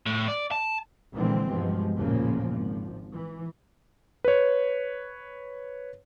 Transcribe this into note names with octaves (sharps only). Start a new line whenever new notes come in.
A2
D5
A5
A#2 D3 E3 F3 G#3 C4
G2 B2 F3 G#3
A1 E2 A#2 C#3 F3 A#3
G#1 F3
E3
B4 C#5